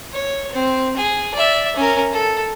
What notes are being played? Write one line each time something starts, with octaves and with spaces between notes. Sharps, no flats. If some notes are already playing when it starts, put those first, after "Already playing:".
C#5
C4
G#4
D5 E5
C#4 A#4
A4